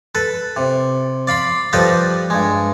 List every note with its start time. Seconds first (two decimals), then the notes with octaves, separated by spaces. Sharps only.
0.15 A4 B4
0.57 C3
1.27 D5 F5 B5 C6
1.73 F3 G3 G4 A4 B4 D#5
2.30 G2 G#3